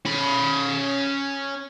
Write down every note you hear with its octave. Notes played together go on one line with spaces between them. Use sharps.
C#4 B5